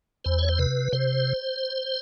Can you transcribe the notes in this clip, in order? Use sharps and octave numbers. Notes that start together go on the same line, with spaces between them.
E2 C5
C#5
C5
C3 B4
C3 C5